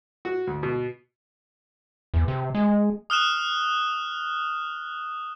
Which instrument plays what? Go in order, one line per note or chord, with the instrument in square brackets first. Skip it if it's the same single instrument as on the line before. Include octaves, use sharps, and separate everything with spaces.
[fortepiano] F#4
D2
B2
[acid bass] E2
C3
G#3
[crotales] D#6 F6 F#6 E7